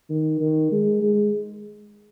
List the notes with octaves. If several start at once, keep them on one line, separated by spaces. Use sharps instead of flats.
D#3
D#3
G#3
G#3